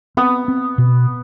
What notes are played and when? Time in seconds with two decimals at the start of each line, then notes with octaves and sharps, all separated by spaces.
0.17 B3 C4
0.48 C4
0.78 B2